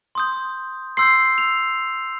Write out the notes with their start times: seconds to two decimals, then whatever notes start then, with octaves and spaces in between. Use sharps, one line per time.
0.15 C6 D#6 G6
0.97 C6 E6 G6 C7
1.38 F7